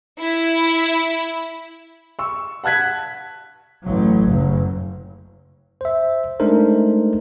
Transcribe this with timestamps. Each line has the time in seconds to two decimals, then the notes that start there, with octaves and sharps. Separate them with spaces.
0.19 E4
2.19 C#6 E6
2.64 F#5 A5 F#6 G#6 B6
3.83 A1 F#3
4.30 F#1
5.81 C5 E5
6.40 G#3 A3 D4 D#4 A#4 C5